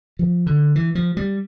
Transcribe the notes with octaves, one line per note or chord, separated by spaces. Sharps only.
F3
D3
E3
F3
G3